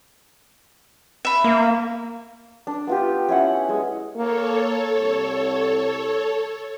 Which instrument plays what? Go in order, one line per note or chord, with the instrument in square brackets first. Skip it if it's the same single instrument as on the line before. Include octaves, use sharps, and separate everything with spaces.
[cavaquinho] E5 B5
[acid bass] A#3
[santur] D4
B3 F4 G4
C#4 E4 F#5
G#3
[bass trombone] A#3 [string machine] A4 C#5
[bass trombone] C2